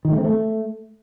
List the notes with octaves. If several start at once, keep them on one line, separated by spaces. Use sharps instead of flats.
D#3
A3
C4
A3